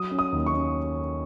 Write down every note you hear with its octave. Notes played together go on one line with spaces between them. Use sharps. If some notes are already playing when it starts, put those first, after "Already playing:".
Already playing: F#3 D#6
C#4
D#6
D#2
C#6
C#4